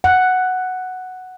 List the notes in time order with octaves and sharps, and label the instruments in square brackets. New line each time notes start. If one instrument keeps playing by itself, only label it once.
[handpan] F#5